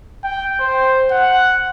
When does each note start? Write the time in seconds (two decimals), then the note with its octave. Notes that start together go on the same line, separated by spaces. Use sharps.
0.24 G5
0.60 C5
1.11 F#5